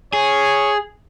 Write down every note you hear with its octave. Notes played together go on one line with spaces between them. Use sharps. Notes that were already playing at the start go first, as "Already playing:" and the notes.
G#4 C#5